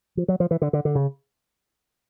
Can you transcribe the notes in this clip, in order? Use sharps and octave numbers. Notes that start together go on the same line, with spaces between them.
F3
F#3
F3
E3
D3
D3
D3
C#3